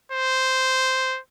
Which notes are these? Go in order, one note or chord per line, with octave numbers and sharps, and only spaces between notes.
C5